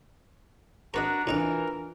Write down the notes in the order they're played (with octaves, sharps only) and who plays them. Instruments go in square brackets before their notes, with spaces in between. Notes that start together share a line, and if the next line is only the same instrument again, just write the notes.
[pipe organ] D4 F#4 A#5 [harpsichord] A#4 B4 D#5
[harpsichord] A2 D#4 A#5 [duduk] E3 [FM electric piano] D4 F4 [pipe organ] A#4